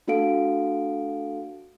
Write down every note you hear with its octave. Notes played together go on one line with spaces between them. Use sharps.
A3 D4 F#4 A4 F5 D7